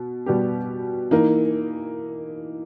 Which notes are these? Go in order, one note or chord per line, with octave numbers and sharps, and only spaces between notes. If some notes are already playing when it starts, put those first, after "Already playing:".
Already playing: B2
B2 G3 B3 G4
E3 A#3 D#4